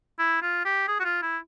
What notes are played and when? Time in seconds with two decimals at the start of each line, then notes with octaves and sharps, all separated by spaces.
0.19 E4
0.42 F4
0.65 G4
0.88 G#4
1.00 F#4
1.05 F4
1.22 E4